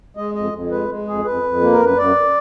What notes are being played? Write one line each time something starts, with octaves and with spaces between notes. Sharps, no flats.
G#3 D#5
F2 D#5
F2
G#3 B4
G#3
F2 G#4
F2 B4
F2
A#3
A#4
F#2 B4
F#2 D5